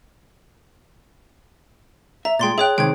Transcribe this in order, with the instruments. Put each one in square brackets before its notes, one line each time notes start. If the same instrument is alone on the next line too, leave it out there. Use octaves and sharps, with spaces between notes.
[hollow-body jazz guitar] E5 [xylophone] A#5
[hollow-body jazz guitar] A#2 G#3 [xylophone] G5 C6 A6
[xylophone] G#4 C#5 F#6 [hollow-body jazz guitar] E5 G5
[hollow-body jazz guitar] C3 D#3 G#3 [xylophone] G5 G#6